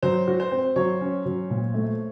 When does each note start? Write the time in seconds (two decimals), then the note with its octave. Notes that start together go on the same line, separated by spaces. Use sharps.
0.03 F#3 C5
0.28 F#4
0.40 C5
0.52 C4
0.76 F#3 C#5
1.01 C#4
1.26 F#3
1.50 A#2
1.74 A3